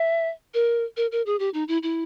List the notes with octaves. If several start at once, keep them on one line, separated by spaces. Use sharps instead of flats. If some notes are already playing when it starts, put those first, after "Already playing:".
Already playing: E5
A#4
A#4
A#4
G#4
G4
D#4
E4
E4